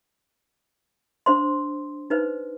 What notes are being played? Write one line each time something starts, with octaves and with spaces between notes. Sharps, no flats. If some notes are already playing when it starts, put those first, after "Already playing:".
D4 C5 C6
D#4 B4 C5